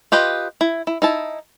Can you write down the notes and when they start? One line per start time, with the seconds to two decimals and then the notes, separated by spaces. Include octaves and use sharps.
0.12 F4 G4 B4 D#5
0.61 E4
0.87 E4
1.02 D#4 E4 A5